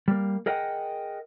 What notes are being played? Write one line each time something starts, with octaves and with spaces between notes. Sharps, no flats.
G3 A#3
G#4 A#4 D#5 F#5 G5